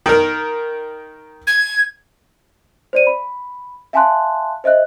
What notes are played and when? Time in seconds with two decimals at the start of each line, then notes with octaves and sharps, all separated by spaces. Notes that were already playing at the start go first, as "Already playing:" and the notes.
0.06 D#3 A#4
1.47 G#6
2.93 C5 D5 D#7
3.07 B5
3.93 E5 F5 G#5 A5 C6 F#6
4.64 C5 D#5 E5 F#6